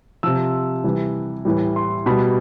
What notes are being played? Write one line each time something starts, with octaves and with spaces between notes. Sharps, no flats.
C3 F3 E6
C3 E3 G3
A2 E3 G3
C6
B2 G3 B5